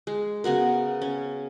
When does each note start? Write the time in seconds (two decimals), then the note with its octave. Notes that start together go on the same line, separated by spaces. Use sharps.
0.07 G#3
0.44 C#3 B3 F#4 A#4
1.02 C#4